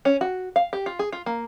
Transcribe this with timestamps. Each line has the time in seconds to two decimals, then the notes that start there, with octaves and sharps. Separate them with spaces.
0.05 C#4
0.21 F#4
0.56 F5
0.73 G4
0.86 F4
0.99 G#4
1.12 F4
1.26 A#3